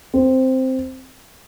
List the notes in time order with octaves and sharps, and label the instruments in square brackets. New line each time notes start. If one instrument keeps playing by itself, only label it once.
[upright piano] C4